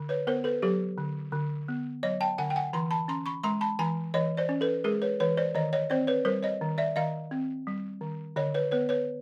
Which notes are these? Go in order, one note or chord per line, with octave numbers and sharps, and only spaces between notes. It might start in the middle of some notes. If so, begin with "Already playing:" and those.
Already playing: D3
B4 C#5
B3 A#4 C5
A4 B4
F#3 G4 A4
D3
D3
B3
F#3 C#5 D#5
G5 A5
D3 F#5 G#5
G5
F#5 G#5
E3 A#5 C6
A5 B5
C#4 A#5 C6
B5 C#6
G#3 A#5 C6
A5 B5
E3 G#5 A#5
E3 C#5 D#5
C5 D5
C#4
A4 B4
G#3 G#4 A#4
B4 C#5
E3 B4 C#5
C5 D5
D#3 C#5 D#5
C#5 D#5
C4 C5 D5
B4 C#5
G3 A#4 C5
C#5 D#5
D#3
D5 E5
D#3 D#5 F5
C4
G3
D#3
D3 C#5 D#5
B4 C#5
B3 B4 C#5
B4 C#5